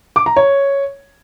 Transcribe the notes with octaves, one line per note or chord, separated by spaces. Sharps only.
D6
A#5
C#5